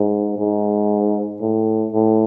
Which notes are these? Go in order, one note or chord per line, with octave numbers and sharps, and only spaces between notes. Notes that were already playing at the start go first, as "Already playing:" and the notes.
Already playing: G#2
G#2
A2
A2